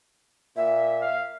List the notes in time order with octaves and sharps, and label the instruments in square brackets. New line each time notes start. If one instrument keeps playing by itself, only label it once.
[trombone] A#2 [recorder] E5
[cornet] F5